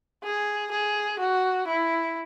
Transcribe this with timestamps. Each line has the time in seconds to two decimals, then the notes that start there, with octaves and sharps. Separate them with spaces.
0.23 G#4
0.71 G#4
1.19 F#4
1.67 E4